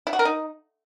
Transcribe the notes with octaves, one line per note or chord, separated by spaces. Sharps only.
E4
F#4
A#4
D#4